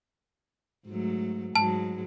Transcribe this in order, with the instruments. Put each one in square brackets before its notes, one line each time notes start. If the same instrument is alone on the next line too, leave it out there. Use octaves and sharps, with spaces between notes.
[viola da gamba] G#2 F#3 A3
[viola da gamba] G#2 F#3 G#3 [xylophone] A5